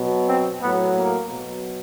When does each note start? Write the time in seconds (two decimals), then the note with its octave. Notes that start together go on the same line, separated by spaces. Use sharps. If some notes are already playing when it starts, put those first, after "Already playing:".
Already playing: B2 F#3
0.26 C4
0.60 A2 F#3 B3
0.95 A#3
1.29 B2 F#3